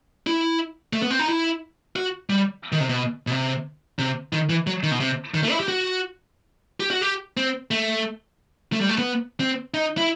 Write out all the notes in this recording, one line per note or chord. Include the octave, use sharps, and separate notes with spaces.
E4
A3
B3
C4
D#4
E4
F#4
G3
D#3
C3
B2
B2
C3
C3
D#3
E3
F#3
D#3
B2
C3
D#3
A3
E4
G4
F#4
G4
F#4
G4
C4
A3
A3
G3
A3
B3
C4
D#4
E4